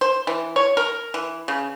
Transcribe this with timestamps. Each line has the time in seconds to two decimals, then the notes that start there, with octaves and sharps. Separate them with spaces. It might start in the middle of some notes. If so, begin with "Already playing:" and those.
0.01 C5
0.27 E3
0.56 C#5
0.77 A#4
1.14 E3
1.48 C#3